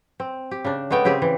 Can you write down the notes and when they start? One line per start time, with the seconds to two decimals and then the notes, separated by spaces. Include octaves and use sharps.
0.20 C4
0.51 G4
0.64 C#3 D4
0.91 G#3 A3 B3 G5
1.05 C#3 C4 G4 G#4
1.22 E3